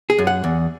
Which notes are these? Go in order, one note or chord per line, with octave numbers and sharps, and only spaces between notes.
G#4
F#2
F#5
E2